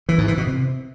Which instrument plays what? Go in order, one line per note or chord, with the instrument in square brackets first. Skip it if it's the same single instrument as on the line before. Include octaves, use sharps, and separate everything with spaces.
[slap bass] E3
G#2
E3
B2
C3